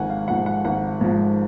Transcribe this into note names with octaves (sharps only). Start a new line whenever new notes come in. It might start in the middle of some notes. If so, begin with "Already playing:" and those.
Already playing: G#1 G#2 F3 F#5 G#5
F5
G#2 F3 F#5
F#5
G#1 F#5
G#2 F3